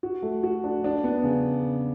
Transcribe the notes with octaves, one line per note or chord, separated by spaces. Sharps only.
F#4
A3
F#4
D4
D4
B3
C#3